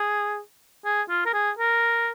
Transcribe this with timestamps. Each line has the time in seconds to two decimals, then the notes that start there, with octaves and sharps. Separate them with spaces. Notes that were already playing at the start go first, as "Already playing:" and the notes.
Already playing: G#4
0.85 G#4
1.09 F4
1.26 A#4
1.33 G#4
1.59 A#4